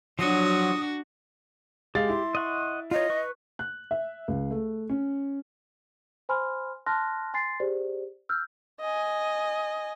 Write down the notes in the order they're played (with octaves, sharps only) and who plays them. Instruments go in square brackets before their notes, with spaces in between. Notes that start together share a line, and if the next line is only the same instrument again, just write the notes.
[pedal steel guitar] F3 F#3 [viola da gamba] D4 F#4 [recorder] D#6
[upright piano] G#3 F5 A6 [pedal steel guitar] G4
[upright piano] E4 [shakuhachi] C6
[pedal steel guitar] D#5 F#5 C#6
[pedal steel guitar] F4 C#5 [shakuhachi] D#5
[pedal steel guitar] B4 C#6
[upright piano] F#6
E5
C#2
A3
C#4
[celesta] C5 G#5 B5 C6 F6
A5 C6 F6 F#6 A#6
G#5 C6 A6 C7
G4 G#4 C5 D5
E6 F6 G6
[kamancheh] D#5 G#5